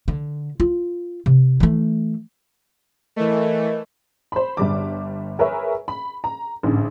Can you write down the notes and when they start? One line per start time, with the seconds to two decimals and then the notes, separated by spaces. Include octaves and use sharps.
0.08 D3
0.60 F4
1.26 C3
1.60 E3 A3
3.16 E3 A3 A#4 D#5
4.32 C5 B5
4.57 G1 G3 D6
5.39 G#4 A#4 B4 C#5 E5
5.88 B5
6.24 A#5
6.63 A1 G#2 D3